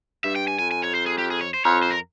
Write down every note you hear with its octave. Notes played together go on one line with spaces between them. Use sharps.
G2 E5
G5
G#5
F2 G#5
G#5
C#5
C5
G#4
G4
G#4
C#5
C5
F2 C#5
C5
A#4